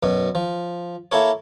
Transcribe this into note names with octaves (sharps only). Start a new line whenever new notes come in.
F#2 B2
F3
A#3 E4 A4 C#5